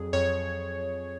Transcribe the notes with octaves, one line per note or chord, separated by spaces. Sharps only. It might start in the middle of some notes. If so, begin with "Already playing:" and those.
Already playing: F2 F#3 G#4
F2 C#5